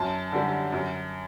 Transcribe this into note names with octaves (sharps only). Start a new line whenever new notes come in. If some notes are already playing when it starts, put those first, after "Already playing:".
Already playing: F#2 A5
D3 G3
F#2